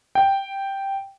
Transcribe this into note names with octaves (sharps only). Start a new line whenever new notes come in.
G5